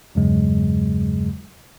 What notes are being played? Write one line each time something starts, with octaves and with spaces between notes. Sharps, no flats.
E2 G2 C#3 F#3 G#3